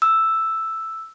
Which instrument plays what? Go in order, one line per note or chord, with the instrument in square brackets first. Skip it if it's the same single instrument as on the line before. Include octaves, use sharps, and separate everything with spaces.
[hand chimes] E6